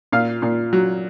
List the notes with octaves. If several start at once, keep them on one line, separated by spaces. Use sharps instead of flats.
A#2 F5
A#2
F#3